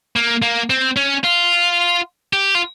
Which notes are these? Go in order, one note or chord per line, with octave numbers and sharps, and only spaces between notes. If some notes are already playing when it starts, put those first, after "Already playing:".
A#3
A#3
C4
C#4
F4
G4
F4